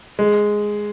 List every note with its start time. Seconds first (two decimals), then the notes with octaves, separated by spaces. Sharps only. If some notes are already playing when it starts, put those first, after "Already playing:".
0.19 G#3